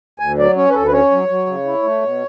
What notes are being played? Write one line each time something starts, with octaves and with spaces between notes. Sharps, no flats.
D2 G#5
F#3 D5
C#4 C#5
B4
D2 A4
B4
C#4 C#5
F#3
F#3
C#3
E4
A3
B2